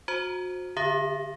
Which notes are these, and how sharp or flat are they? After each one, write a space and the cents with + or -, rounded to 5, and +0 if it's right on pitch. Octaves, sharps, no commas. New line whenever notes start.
F#4 -30 C5 +10 A#5 +0
D3 +0 G4 +45 E5 +0